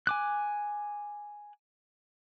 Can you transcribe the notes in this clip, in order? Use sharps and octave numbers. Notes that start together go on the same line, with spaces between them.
G#5 D6 F#6